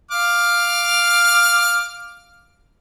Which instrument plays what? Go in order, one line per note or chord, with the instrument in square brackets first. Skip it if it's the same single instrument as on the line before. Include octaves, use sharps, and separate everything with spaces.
[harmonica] F5 D6 F6